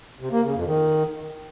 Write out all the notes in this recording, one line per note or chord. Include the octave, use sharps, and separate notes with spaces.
C3
A#3
C#3
F2
D#3